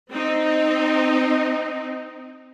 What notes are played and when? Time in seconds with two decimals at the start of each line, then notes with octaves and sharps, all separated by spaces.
0.10 C4 D#4